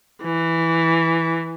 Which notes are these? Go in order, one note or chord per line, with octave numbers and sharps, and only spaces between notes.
E3